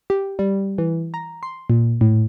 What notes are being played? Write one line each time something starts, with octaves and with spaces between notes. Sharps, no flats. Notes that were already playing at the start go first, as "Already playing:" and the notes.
G4
G3
E3
A#5
C6
A#2
A2